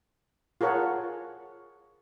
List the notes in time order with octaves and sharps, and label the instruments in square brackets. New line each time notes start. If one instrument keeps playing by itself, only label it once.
[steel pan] F4 G#4 A#4 C#5 F#5 A5